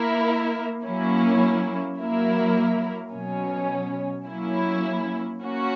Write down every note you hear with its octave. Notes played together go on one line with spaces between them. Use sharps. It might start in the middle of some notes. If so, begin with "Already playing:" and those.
Already playing: A#3 E4 A#4
F#3 A#3 C#4 E4
F#3 A#3 E4 A#4
B2 F#3 C#4
F#3 A#3 C#4 E4
A#3 C#4 F#4